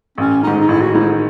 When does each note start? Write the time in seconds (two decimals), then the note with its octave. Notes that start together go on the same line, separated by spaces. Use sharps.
0.18 A1 C#4
0.43 G#2 D#3 D#4
0.61 D#4
0.69 A1 E4
0.81 F#4
0.94 G#2 D#3 E4